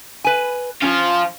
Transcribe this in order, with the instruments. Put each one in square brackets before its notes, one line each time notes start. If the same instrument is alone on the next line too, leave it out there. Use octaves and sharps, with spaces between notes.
[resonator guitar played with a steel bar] B4 G#5
[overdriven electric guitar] F3 F4 [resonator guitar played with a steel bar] C#4